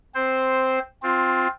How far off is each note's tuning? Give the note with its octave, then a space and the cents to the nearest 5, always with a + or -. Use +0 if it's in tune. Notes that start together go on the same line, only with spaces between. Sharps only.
C4 +0 C5 +0
C4 +0 F4 +15